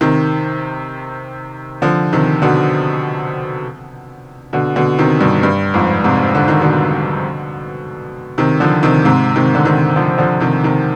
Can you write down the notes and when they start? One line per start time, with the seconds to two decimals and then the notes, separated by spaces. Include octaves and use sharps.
0.01 C3 D#3
1.82 D3 F3
2.13 C3 D#3
2.42 B2 D3
4.53 B2 D3
4.76 B2 D3
4.99 C3 D#3
5.20 G2 B2
5.43 G2
5.74 F2 G#2
6.04 G#2 C3
6.35 D3
6.48 D#3
6.61 B2 D3
8.38 C3 D#3
8.60 D3 F3
8.83 C3 D#3
9.05 G#2 C3
9.36 C3 D#3
9.55 D3
9.65 C3 D#3
9.96 D3 F3
10.18 D3 F3
10.40 C3 D#3
10.63 C3 D#3